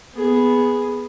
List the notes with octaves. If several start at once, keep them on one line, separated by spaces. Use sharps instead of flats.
B3 G#4